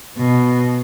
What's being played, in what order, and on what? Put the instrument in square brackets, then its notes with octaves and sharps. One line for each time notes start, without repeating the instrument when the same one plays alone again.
[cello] B2